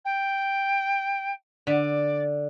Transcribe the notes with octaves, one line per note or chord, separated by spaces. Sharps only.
G5
D3 D5